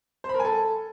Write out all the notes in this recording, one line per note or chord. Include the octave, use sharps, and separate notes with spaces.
C5
B5
A#4
G#5
A4